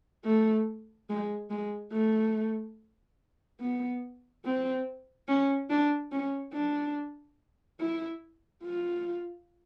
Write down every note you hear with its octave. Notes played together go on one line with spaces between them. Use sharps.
A3
G#3
G#3
A3
B3
C4
C#4
D4
C#4
D4
E4
F4